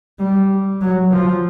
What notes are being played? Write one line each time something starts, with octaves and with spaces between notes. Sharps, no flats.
G3
F#3
F3